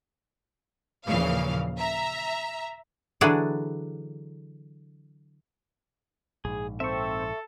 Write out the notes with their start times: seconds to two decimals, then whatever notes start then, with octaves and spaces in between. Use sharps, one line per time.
1.07 D#2 A#2 C#3 E3 F3 F5
1.78 E5 A#5
3.21 D3 E3 F#3 D4 G#4 D5
6.45 A#1 G#2 G#4
6.80 C4 A4 E5 C#6